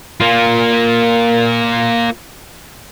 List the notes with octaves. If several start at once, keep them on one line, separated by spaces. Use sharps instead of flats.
A#3 F4